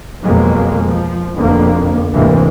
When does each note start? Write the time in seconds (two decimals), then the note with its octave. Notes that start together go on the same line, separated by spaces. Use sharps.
0.23 F2 B2 F#3 G#3 A#3
0.85 F3
1.36 F1 F2 B2 D3 A#3
2.13 D2 G#2 C3 E3 G#3 A#3